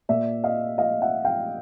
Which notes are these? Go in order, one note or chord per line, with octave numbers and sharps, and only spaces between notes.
A#2 D5 E5
D#5 F5
D#5 F5
E5 F#5
F5 G5